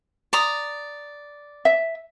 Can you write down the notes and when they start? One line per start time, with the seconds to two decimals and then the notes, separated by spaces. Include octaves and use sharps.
0.33 D5 A#5 D#6
1.65 E5